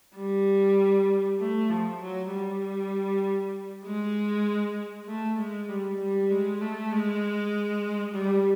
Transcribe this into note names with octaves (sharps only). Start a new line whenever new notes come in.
G3
A3
F3
F#3
G3
G#3
A3
G#3
G3
G3
G#3
A3
G#3
G3